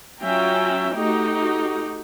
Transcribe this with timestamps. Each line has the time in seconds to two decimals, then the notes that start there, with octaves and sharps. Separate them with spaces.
0.21 F#3 C#4 F4 E5 G5 A#5
0.95 A3 D#4 F#4 G4